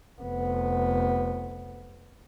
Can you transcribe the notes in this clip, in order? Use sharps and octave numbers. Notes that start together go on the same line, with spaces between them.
F1 B3